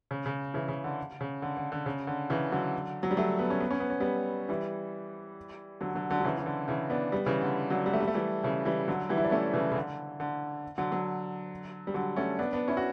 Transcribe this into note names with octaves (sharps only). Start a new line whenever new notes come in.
C#3
C#3
C#3 E3
C#3
D3
C#3
D3
D3
D3
C#3
D3
C#3 E3
D3 F#3
F#3
G3
F#3 A3
B3
C#4
B3
C#4
B3
C#4
G3 B3
E3 G3
D3 F#3
D3 F#3
D3 F#3
F#3
C#3 E3
E3
D3
C#3 E3
B3 D4
G3 B3
C#3 E3
D3
D3 F#3
G3
A3
G3
A3
E3 G3
C#3 E3
E3 G3
D3 F#3
E3 G3
E4
D4
A3 C#4
C#3 E3
C#3
D3
D3
D3 F#3
D3 F#3
G3
D3 F#3
A3 C#4
B3 D4
B3 D4
C#4 E4
F#4